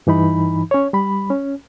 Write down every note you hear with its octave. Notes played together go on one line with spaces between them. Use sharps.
G2 E3 D#4 B5
C#4 C#5
G3 B5
C#4